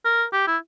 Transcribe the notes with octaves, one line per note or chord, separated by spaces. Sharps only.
A#4
G4
E4